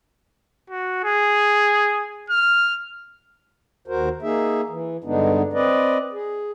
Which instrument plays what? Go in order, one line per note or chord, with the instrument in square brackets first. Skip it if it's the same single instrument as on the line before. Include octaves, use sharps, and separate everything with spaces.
[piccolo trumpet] F#4
G#4
F6
[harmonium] D#2 F#4 A#4 C5
A#3 D#4 G#4 E5
E3
G2 D3 G#3 B3 D4 D#4
C4 B4 D5 D#5
G#4